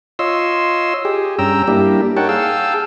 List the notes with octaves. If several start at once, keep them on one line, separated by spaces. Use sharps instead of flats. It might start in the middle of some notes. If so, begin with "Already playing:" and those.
F4 C#5 D#5 C6 E6
G4 G#4
G2 C#4 G5 A#5 E6
G3 A#3 D4 E4 G4
D#4 A#4 C#5 F#5 G5 A5
G#4 F5 G5 A5 E6